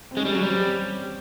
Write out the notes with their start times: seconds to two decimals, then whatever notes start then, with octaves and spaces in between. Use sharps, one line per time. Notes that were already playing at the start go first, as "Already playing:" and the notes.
0.11 C4
0.17 G#3 C#4
0.25 G3
0.34 F#3
0.43 G3 C4